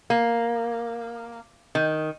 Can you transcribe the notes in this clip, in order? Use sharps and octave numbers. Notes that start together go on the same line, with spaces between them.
A#3
D#3